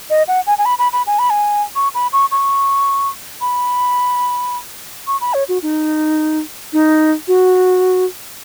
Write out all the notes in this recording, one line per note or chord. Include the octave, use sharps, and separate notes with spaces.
D#5
F#5
G#5
G#5
B5
B5
B5
G#5
B5
G#5
C#6
B5
C#6
C#6
B5
C#6
B5
C#5
F#4
D#4
D#4
F#4